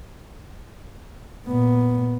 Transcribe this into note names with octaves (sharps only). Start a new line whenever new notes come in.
A#2 B3